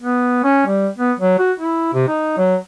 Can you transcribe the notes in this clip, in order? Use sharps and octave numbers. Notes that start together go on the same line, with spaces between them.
B3
C#4
G3
B3
F#3
F#4
E4
C3
D#4
F#3